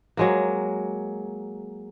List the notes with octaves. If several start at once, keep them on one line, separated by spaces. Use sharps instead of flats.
F#3 G#3 A#3